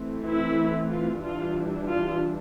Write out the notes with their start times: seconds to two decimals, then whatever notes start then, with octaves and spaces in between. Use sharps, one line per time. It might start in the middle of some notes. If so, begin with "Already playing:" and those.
Already playing: E3 A3 C4
0.23 E4
0.89 F4
1.22 E3 G3 D4 F4
1.88 F4